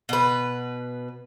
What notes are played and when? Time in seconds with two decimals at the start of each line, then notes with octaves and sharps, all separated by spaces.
0.09 B2 B4